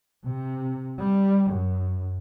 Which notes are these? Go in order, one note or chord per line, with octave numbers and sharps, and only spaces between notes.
C3
G3
F#2